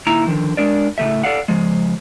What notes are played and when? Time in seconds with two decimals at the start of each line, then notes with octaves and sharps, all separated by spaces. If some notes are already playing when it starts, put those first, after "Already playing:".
0.07 A#2 D#3 E4 A#5
0.26 D3 D#3 F3
0.57 G#3 D4 A#4 D5
0.98 A2 C#3 A3 E5
1.23 A4 D5 F5 F#5
1.48 C#3 F3 G#3